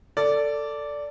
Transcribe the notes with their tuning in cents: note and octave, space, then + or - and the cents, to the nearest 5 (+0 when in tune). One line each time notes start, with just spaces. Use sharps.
A4 +20 D5 -10